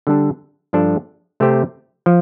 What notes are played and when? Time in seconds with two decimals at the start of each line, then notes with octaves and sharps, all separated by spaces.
0.07 D3 G3 D4 A4
0.73 G2 F3 D4 A4 C5
1.40 C3 A3 C4 G4 C5
2.06 F3